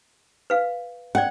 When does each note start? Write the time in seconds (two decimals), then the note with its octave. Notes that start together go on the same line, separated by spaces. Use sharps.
0.50 B4 F5
1.15 C#4 D5 F#5